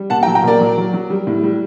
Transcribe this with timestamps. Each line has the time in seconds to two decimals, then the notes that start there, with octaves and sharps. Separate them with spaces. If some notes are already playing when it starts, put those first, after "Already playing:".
Already playing: G3
0.10 A#2 F#5 A5
0.23 G5 A#5
0.27 F#3
0.35 G5 A#5
0.43 A#2 A#4 D5
0.60 F#3
0.77 F#3
0.93 F#3
1.10 G3
1.27 A2
1.43 G3